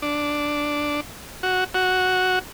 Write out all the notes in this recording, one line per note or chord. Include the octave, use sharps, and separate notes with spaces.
D4
F#4
F#4